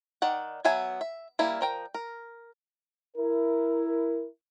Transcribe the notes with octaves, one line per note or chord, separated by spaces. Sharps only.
D#3 D5 F#5
F#3 B3 E5 G#5
E5
G3 A#3 E4
F3 A#4 G5
A#4
E4 A#4